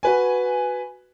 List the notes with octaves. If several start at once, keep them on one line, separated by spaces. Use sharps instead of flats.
F#4 B4 G#5